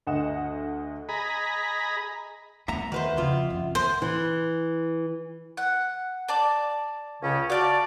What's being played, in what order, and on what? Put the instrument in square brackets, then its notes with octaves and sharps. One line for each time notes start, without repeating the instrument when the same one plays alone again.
[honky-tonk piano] D2 D#5 F#5 E7
[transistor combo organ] G#4 D#5 A#5 B5
[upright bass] E2 A3 [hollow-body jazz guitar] E5 F#5 A#5
[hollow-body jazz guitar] D#3 B4 C5 [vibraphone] E5 F#5
[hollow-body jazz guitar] F2 F4 [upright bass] C#3
[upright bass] F#2
[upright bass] D#3 [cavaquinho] C5
[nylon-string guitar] E3
[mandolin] F#5
D5 A5 D6
[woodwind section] C#2 C#3 C#4
[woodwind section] F#4 D5 [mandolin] F5 G5 A5